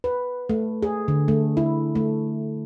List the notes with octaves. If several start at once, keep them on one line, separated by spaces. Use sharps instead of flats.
B4
A3
G#4
D3
A3
E4
A3